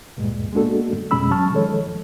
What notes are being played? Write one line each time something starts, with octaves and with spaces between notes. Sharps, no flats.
D2 G2 A#2 G#3
G#3 A#3 B3 D4 F#4 A4
F2 B2 G#3 C#4 B5 E6
F#3 C#4 A5 C#6 F6
D#3 F3 G#3 A4 C#5